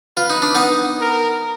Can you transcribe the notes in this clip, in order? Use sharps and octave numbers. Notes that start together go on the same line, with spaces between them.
F4 B4
D#4
D4
B3 D#4
A#4